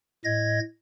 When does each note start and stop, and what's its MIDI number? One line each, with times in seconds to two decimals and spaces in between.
0.25 0.60 45
0.25 0.60 75
0.25 0.60 92
0.25 0.60 94